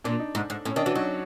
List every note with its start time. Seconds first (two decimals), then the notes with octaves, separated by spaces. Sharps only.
0.04 A#2 D4
0.19 D#4
0.35 G#2
0.50 G#2
0.65 A2 C#4
0.76 D#3 D4
0.86 E3 F#4
0.95 F#3 D#4